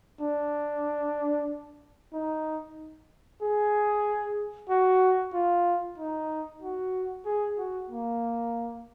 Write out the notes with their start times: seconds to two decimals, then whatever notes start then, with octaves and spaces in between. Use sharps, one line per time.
0.20 D4
2.13 D#4
3.42 G#4
4.69 F#4
5.33 F4
5.98 D#4
6.62 F#4
7.25 G#4
7.57 F#4
7.90 A#3